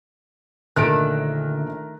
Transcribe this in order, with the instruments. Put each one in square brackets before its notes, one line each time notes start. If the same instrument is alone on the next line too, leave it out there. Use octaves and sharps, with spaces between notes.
[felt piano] A#1 D4 F#6 [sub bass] D3 [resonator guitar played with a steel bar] D#3 A3 [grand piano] A#4 D7